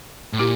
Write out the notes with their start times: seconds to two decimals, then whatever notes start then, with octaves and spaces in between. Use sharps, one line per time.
0.33 A2
0.39 A#2 E4 G4